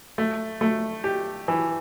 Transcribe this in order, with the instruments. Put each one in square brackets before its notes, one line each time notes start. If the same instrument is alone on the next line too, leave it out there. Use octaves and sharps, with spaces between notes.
[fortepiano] A3
A3
G4
E3